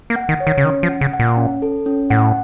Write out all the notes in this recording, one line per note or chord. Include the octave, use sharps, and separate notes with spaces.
A#3
F#5
D#3
C#5
D#3
C#3
D#3 C#4
F3
F#5
C#3
F#5
A#2
C#4
A4
C#4
A2 F#5